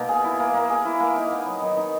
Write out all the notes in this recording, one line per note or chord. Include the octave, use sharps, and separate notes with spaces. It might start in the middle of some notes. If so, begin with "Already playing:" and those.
Already playing: B2 A#3 D#4
G#4
E4
A#3
A#3
G#4
E4
A#3
D#4
B3
F#3
D#3
D#4